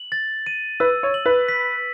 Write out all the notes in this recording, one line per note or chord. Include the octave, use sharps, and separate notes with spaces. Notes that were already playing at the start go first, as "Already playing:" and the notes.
Already playing: F#7
A6
D#7
B4 E6
C#5
F#7
B4
B6